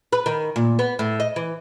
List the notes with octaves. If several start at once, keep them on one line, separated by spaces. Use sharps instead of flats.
B4
D#3
A#2
B3
A2
D#5
E3